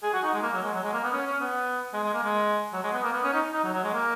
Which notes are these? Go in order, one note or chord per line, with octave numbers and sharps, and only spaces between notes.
G#4
F#4
D#4
G#3
A#3
F#3
G#3
F#3
G#3
A#3
B3
C#4
C#4
B3
G#3
G#3
A#3
G#3
F#3
G#3
B3
A#3
B3
C#4
D#4
D#4
F#3
F#3
G#3
A#3